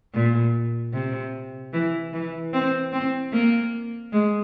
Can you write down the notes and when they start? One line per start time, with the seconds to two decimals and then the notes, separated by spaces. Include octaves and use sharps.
0.14 A#2
0.93 C3
1.73 E3
2.13 E3
2.53 C4
2.93 C4
3.33 A#3
4.12 G#3